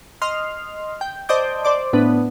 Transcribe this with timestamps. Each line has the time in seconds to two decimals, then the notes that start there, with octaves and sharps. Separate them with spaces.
0.22 D#5 C6 F6
1.01 G5
1.29 C5 D5 D#5 A5 D6 G6
1.65 C5 D5 D6
1.93 A2 B3 D4